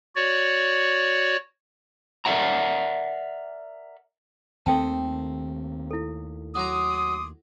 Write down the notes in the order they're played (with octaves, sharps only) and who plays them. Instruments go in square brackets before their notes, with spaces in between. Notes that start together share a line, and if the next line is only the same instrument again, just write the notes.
[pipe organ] F#4 C#5 D5
[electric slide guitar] A#4 D5 E5 F#5 A#5
[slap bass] D#2 D#3 A3 [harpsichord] C4 [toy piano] A4 G5 A5
[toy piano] E4 A4
[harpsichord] F#3 A#5 [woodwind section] C6 D6 D#6